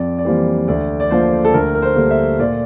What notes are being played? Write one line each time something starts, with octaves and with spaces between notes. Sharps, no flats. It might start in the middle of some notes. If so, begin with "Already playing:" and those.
Already playing: F2 D5
D5
E3 G3 A#3 C5
D2 D5
D5
D3 F3 A#3 C5
A4
D2 A#4
A#4
C5
D3 G3 A#3
E5
A#2 D5